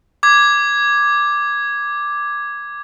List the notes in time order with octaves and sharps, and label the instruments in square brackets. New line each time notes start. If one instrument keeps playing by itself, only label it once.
[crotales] D6 G#6